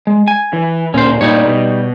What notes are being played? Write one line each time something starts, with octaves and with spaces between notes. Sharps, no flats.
G#3
G#5
E3
D1 A#2 C#4 C5
G2 A#2 G3 D#4 C#5
B2